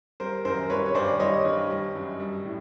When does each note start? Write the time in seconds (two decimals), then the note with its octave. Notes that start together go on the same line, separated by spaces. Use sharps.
0.20 G3 A#4 C5
0.45 F#2 A#4 C5
0.70 G3 B4 C#5
0.86 C#5
0.95 G2 C5 D5
1.20 G3 C#5 D#5
1.45 G2
1.70 G3
1.95 F#2
2.20 G3
2.45 A2